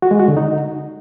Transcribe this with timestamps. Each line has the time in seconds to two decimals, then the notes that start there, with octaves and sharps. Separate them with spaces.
0.02 F#4
0.11 G#3
0.20 F#4
0.28 D3
0.37 D#4